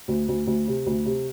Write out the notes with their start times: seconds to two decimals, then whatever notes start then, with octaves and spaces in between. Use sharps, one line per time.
0.08 D2
0.28 D2
0.47 D2
0.67 C3
0.86 D2
1.06 C3